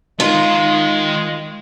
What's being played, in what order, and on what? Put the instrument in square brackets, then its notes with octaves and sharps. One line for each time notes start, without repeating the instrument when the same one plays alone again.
[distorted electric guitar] D#3 A#4 [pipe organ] G#3 [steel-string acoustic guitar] F4